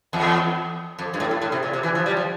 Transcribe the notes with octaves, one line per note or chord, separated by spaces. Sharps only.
E2
F2
G2
A2
A2
A2
C3
A#2
C3
E3
F3
G3
F3